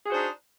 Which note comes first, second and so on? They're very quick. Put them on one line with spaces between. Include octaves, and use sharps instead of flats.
G#4 F#4 C5 D4 D#4